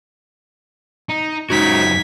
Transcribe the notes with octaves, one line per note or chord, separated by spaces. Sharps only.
D#4
C#2 F#2 G#3 D#4 F#4 G#6 B6